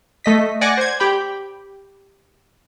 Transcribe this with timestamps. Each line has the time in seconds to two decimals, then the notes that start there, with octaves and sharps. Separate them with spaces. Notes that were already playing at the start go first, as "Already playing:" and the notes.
0.24 A3 D#5 B6
0.61 D5 F#5 G#5 D6 A#6 C#7
0.77 C5 G#6
1.00 G4 G5 B5